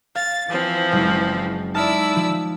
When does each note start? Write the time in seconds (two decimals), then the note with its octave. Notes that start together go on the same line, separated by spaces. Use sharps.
0.15 F5 A6
0.48 E3 F3 C4
0.92 F#1 G#3
1.74 D#4 E4 D5 A5 E6 F6
2.16 F3